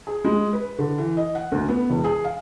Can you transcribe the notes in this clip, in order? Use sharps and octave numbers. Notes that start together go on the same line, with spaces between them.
G#4
G#3
B4
D3
E3
D#5
F#5
D2
B3
E1
G#4
F5